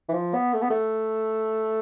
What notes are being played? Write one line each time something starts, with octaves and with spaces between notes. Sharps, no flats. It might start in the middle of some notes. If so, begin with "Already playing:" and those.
E3
F3
B3
A3
B3
A3